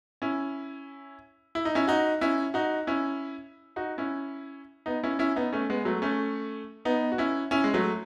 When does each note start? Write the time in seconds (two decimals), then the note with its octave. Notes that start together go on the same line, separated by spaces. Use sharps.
0.22 C#4 E4
1.55 E4
1.65 D#4
1.75 C#4 E4
1.87 D#4 F#4
2.21 C#4 E4
2.54 D#4 F#4
2.87 C#4 E4
3.76 D#4 F#4
3.98 C#4 E4
4.86 B3 D#4
5.04 C#4 E4
5.19 C#4 E4
5.36 B3 D#4
5.53 A3 C#4
5.70 G#3 B3
5.85 F#3 A3
6.02 A3 C#4
6.85 B3 D#4
7.12 F#4
7.18 C#4 E4
7.51 C#4 E4
7.64 G#3
7.74 F#3 A3